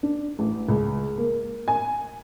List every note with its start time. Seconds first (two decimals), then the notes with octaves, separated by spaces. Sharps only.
0.03 D4
0.39 A1
0.69 C#2
1.18 A#3
1.68 G#5